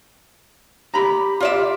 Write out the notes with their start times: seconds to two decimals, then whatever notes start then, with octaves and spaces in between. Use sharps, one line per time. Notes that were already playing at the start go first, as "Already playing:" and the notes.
0.94 G4 A#5 B5
1.40 F4 D5 E5